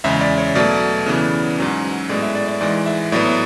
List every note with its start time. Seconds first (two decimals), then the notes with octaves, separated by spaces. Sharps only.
0.04 E2 C#3 G#3 E5
0.21 D5
0.38 C#5
0.55 B2 F#3 A3 D5
1.06 C#3 E3 B3
1.58 G#2 F#3 C#4
2.09 A2 G#3 B3 D5
2.22 E5
2.35 D5
2.48 D5
2.61 G#2 E3 G#3 D5
2.86 E5
3.12 A2 F#3 B3 D5